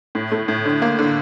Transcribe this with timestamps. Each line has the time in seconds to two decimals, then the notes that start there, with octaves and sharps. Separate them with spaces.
0.15 A2
0.32 A3
0.48 A2
0.65 D3
0.82 A#3
0.99 D3